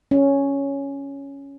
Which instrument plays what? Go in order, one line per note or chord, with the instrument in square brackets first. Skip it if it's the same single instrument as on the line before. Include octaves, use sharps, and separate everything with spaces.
[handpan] C#4